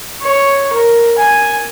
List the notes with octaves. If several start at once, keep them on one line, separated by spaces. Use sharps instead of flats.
C#5
A#4
G#5